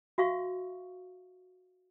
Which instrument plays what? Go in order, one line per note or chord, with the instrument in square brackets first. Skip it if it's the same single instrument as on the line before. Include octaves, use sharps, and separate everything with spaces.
[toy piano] F#4 E5 F5 C#6